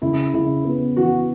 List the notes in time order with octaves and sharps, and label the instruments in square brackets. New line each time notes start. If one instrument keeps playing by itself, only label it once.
[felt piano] C#3 [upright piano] E4
[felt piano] C#3 [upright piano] E4
[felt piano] B3
[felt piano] E3 [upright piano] F#4